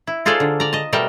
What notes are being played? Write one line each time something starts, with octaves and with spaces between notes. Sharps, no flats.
E4
D#4 F4 G#4 A4 C5 D5
D3
D5 A#5
D#5 A5
B2 G3 A3 A#4 G5 A5